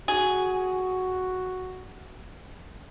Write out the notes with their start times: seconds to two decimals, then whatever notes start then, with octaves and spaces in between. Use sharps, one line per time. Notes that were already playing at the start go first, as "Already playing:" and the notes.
0.08 F#4 G#4